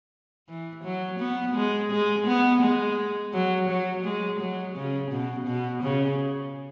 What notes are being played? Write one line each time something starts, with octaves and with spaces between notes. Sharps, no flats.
E3
F#3
B3
G#3
G#3
B3
G#3
F#3
F#3
G#3
F#3
C#3
B2
B2
C#3